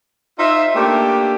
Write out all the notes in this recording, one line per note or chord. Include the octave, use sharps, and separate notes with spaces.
D#4 F4 C5 E5
A3 A#3 D4 G4